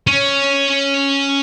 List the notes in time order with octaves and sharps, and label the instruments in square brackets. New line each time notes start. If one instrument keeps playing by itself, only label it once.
[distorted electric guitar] C#4